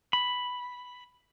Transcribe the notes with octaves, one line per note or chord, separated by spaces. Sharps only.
B5